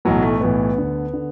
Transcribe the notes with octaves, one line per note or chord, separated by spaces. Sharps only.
B1 A2 E3 F#3
A3
B1 A2 E3 B3
D2 D3
D3